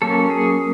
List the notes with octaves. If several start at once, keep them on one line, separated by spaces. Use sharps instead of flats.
F#3 A#3 C#4 A4
G#4